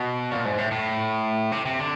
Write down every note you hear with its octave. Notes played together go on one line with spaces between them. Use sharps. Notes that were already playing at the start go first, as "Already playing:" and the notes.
Already playing: B2
A#2
G#2
A2
A2
C3
C3
D3